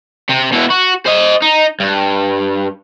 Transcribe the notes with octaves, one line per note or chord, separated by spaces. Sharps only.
C3
B2 E4
F#4
C5 D#5
D#4
G2